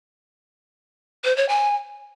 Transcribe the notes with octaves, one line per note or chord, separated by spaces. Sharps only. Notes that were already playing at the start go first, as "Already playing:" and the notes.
C5
C#5
G#5